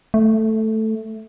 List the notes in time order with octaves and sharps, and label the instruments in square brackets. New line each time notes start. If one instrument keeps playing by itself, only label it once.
[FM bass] A3